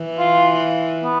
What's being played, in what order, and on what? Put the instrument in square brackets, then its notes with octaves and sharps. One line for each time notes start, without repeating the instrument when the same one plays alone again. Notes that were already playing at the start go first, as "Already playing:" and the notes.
Already playing: [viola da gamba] E3
[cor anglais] F4
B3